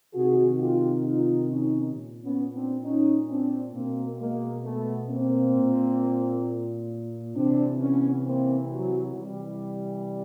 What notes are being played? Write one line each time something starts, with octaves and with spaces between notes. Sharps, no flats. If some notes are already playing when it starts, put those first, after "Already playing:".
C3 D#3 F#4 G#4
F4 G4
D#4 F4
C#4 D#4
A#2
B3 C#4
C4 D4
C#4 D#4
C4 D4
B2 A#3 C4
G#3 A#3
A3 B3
A#3 C4
A#2
C3 E3 C4 D4
B3 C#4
A#3 C4
F#3
C3 E3 G3